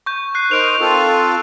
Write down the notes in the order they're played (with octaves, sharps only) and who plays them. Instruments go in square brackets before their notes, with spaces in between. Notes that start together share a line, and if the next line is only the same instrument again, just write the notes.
[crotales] C#6 G6
F#6 C7
[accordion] D#4 A#4 C5 [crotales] C#6 D7 F7
[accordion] C4 F4 A4